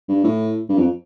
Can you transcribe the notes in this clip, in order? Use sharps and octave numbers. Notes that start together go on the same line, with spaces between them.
G2
A2
G2
F2